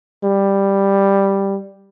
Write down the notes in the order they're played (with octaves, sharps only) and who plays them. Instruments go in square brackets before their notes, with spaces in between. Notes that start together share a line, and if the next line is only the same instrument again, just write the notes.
[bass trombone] G3